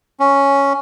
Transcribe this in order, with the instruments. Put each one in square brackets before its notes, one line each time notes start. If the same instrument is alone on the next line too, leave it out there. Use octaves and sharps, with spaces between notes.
[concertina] C#4